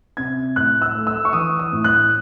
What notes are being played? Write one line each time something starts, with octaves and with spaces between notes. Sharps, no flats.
C3 G#6
A2 F#6
E6
A3
E6
C#6
E3 D#6
D#6
A2
F#6